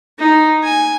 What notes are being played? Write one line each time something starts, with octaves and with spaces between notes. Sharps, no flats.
D#4
G#5